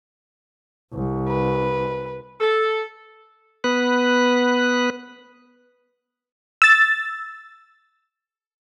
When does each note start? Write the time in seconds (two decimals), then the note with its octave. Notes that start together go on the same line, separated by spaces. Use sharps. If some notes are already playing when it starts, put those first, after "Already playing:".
0.93 C2
1.28 B4
2.40 A4
3.64 B3 B4 F#6
6.62 E6 A6